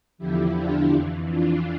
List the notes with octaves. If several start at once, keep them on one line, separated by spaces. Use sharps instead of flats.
E2 D3 F3 E4 G4
D4 F4
F2 E3
D4 F4